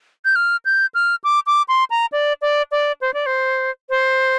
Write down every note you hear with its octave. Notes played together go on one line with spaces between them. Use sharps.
G6
F6
G6
F6
D6
D6
C6
A#5
D5
D5
D5
C5
D5
C5
C5